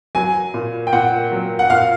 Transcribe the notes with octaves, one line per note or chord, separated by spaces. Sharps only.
F#3 G#5
A#2
G5
A#2 F#5
F#3
F#5
A#2 F5